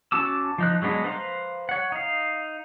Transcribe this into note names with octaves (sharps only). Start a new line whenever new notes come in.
C#4 F#4 A5 D6 E6
F3 D#4 F#6
F#3 G#3 B3 D4
B4 C5 F5 A#5
C#5 F#5
D#4 F5